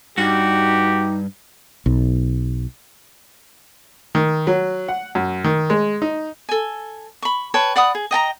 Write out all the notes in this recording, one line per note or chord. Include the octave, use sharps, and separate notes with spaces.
G2 D#4 F#4 G4
B1
D#3
F#3
F#5
F#2
D#3
G#3
D#4
A4 G#5
B5 C#6
B4 C#5 G5 A5
D5 F#5 B5 D#6
G#4
D#5 G5 A5 A#5